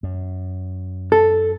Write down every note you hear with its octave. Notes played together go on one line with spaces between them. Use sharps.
F#2
A4